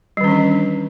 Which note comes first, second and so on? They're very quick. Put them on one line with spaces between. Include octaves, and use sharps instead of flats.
G3 D#3 C#4 E3 D4